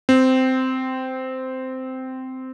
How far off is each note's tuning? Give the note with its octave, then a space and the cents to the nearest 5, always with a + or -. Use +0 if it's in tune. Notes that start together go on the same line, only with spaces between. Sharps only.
C4 -10